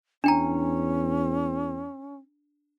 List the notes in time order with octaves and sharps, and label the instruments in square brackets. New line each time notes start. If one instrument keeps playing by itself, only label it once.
[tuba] E2 [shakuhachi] C#4 [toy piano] D4 G5 A#5